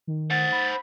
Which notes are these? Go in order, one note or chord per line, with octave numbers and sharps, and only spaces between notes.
D#3
C5 F#5 A6
B5